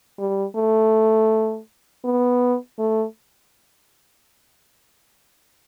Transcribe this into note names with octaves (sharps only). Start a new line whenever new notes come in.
G3
A3
B3
A3